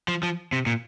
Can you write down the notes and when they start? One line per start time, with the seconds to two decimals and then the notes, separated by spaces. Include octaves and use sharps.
0.08 F3
0.23 F3
0.53 C3
0.66 A#2